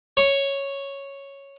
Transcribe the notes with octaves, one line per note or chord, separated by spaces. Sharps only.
C#5 C#6